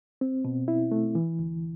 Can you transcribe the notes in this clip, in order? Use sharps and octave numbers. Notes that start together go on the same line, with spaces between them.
C4
B2
E4
A3
E3
D2